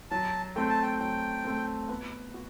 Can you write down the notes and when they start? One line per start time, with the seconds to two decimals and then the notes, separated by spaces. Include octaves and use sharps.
0.11 F#3 A5
0.56 A3 C4 G5
0.69 A5
0.82 G5
1.00 F#3 G5
1.44 A3 C4
1.89 B3
2.34 F#4